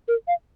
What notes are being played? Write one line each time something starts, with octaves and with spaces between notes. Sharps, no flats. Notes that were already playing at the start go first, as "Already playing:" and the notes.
A#4
F5